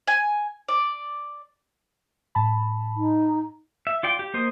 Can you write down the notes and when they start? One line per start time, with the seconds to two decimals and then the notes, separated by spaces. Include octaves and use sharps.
0.07 G#5
0.68 D5
2.35 A2 A5 B5
2.97 D#4
3.87 E5
4.03 F4 D5 G5
4.19 G4
4.34 A#3 C5 D#5